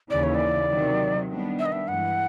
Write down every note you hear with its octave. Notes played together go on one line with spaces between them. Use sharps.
D#2 C#3 E3 D5
C#5
D5
C3 D#3 F#3
D#3 G3 B3 D4
E5
D#5
E5
G2 E3 G#3 F#5